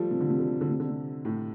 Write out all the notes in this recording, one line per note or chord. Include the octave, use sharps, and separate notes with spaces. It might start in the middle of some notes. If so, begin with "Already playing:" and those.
Already playing: F3 G3 A3
C3
D3
C3
D3
C3
D3
C3
D3
C3
A2